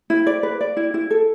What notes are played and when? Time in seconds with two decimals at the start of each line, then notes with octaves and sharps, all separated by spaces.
0.10 E4
0.26 D5
0.43 B4
0.61 D5
0.77 E4
0.94 E4
1.11 A4